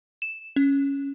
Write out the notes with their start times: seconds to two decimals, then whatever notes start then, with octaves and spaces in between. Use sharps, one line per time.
0.22 E7
0.56 C#4